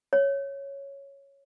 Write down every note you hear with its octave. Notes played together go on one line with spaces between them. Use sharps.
C#5